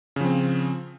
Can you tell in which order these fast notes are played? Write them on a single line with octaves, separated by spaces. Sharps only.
C#3 F3 C4